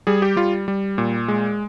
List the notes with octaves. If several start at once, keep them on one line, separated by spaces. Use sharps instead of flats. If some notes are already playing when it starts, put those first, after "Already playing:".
G3 G#4
G4
G3 F4
G3
A#2
G#3